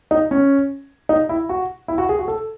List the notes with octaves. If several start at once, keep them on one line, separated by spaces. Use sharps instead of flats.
D#4
C#4
D#4
E4
F#4
E4
F#4
G#4
F#4
A4